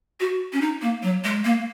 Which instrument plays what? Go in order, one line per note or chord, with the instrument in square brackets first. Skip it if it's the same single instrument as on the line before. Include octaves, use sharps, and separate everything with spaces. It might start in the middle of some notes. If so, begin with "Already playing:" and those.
[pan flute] F#4
C#4
D#4
A#3
F#3
G#3
A#3